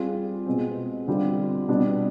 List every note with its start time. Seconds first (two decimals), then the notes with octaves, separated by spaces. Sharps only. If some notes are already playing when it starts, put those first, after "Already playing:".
Already playing: G3 C4 F4 G#4
0.46 B2 G#3 C4
1.08 D3 G3 C4 F4
1.68 B2 G3 D4